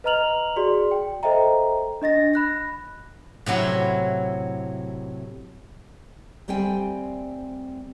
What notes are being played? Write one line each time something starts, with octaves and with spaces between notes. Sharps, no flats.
B4 D#5 A#5 F6 F7 F#7
F#4 G#4 D5 C6
G5
A4 C5 D#5 E5 G5 A#5
D4 D#5 A6 A#6
B5 F#6 A#6
A2 C3 F#3 E4
D2 G3 C4 D5 G5 G#5